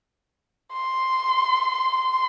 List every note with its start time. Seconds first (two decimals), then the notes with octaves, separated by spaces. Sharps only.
0.73 C6
1.97 C6